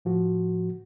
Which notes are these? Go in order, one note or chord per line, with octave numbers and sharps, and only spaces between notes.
A2 F3 F#4